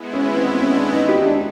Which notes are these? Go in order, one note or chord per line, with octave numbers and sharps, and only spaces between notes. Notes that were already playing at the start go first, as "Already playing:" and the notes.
Already playing: G#3 B3 E4
C#4
C4
C#4
D4
D#4
G4
D4